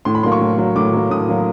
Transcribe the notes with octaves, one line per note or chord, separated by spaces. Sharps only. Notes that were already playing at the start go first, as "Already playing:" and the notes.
A2 C6
B5
F#3 A#3 C6
C#6
A2
F#3 A#3
A2 D6
F#3 A#3
A2 D#6
F#3 A#3